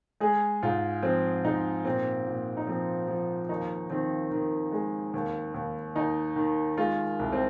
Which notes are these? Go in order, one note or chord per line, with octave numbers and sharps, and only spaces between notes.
G#3 G#4
G#2 F4
F3 C4
G#2 D#4
A#2 C4
A#2
D#4
F3 C4
F3
D#2 D#4
D#3 C4
D#3
G#3
D#2
D#2
D#2 D#4
D#3
G#3 F4
C2
C4